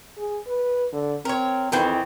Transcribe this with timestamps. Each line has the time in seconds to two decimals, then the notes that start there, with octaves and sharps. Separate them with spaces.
0.17 G#4
0.47 B4
0.93 D3
1.25 C4 A#4 C#5
1.72 F2 D#3 E3 C4